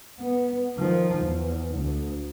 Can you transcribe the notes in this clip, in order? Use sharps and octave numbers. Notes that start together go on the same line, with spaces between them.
B3
D#3 F3
E2
D2